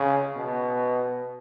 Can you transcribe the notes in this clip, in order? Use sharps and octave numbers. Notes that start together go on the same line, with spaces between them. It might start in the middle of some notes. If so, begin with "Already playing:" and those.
Already playing: C#3
B2